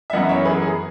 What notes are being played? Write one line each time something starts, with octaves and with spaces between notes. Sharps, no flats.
E5
F#2 E3 B3 D#5 F#5
C#5 E5
G#4 B4
G#4